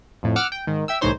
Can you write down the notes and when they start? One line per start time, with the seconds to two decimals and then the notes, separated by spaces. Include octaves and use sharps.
0.23 F2 A2
0.36 F#5 D6 E6 F6
0.52 G5
0.67 G#2 D#3
0.88 E5 G5 E6
1.01 C2 A2 E3 D#4 C5 C#5